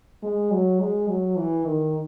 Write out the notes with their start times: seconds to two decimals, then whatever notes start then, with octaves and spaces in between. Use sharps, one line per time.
0.23 G#3
0.52 F#3
0.80 G#3
1.08 F#3
1.37 E3
1.66 D#3